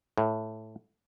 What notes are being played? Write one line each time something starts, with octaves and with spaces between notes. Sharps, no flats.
A2